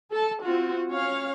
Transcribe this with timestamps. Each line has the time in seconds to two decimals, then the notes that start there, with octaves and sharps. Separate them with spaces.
0.12 A4 A5
0.42 C4 F4 F#4
0.88 C#4 C#5 F5